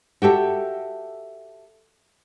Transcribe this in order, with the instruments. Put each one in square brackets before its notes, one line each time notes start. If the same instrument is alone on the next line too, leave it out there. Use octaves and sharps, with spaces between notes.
[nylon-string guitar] F#4 G4 A4 E5